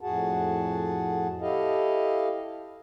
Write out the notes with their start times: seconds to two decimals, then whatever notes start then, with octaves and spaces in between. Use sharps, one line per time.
0.01 F2 A2 F#4 G#4 F#5 A5
1.41 E4 G4 A4 D#5 F5